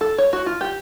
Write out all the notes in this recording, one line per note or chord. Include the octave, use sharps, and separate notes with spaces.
A4
C#5
F#4
F4
G4